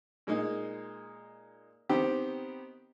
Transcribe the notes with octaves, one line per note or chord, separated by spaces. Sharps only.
A#2 G#3 A#3 D#4
D#3 B3 C4 G4